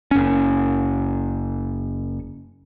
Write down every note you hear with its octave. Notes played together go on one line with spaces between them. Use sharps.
F#1 C#4